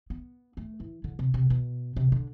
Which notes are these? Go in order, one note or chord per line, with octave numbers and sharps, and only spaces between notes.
B3
A3
E3
D3
C3
C3
B2
C3
D3